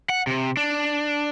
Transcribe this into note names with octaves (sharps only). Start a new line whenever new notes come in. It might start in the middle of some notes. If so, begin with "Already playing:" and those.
F#5
C3
D4